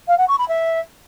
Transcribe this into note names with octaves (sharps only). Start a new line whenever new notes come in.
F5
F#5
C#6
B5
E5